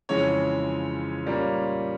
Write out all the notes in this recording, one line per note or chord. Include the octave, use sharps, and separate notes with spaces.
F2 C#3 E3 G#3 C#4 C#5
A#2 G3 A#3 C#4